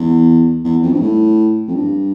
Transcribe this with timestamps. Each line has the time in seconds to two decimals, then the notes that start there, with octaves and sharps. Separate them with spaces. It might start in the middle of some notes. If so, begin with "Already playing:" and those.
Already playing: E2
0.64 E2
0.82 F2
0.92 G2
1.00 A2
1.68 F2
1.75 G2